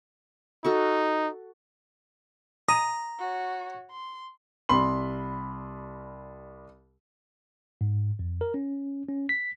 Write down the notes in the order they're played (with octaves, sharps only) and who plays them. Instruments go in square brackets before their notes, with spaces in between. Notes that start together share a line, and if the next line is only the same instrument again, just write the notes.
[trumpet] D#4 [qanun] F#4 A4 C#6
[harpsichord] A#5 [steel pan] D#6
[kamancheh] F#4 C#5
C6
[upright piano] C2 G3 B5 C6 F#7
[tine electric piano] G#2
F2
A#4
C#4
C#4
B6